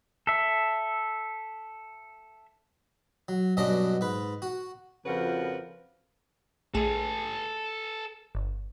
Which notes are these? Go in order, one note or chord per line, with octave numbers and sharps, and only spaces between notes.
A4 E5
F#3
G2 B2 F#3 C#4 D4 D#5
G#2 B4
F#4
F2 C#3 F3 F#4 A#4 B4
A#1 A3 G#4 A4 G#5
G1